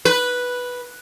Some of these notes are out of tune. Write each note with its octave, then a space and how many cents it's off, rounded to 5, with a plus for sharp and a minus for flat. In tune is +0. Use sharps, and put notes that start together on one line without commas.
B4 -5